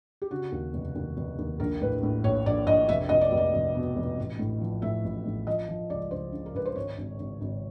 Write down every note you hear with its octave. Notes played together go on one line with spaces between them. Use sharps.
G4
C#3 F#4
D#2
F1
D#2
F1
D#2
A#1 A#4
A2 B4
A2
A#1 C#5
A#1 D5
A#1 D#5
F1 E5
F1 D#5
D5
F1
D5
F1
B2
F1
A1
A2
F3
A2 E5
A1
A2
F3 D#5
F3
C#2 D5
C#2 C5
C#3
A#4
C#2 B4
C5
G#1 C#5
G#1
G#1
G#1